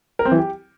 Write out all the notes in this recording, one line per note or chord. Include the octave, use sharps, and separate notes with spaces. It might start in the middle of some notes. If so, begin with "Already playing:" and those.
A#4
C4
E3
G4